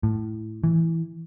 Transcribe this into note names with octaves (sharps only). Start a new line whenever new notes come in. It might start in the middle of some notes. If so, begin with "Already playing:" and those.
A2
E3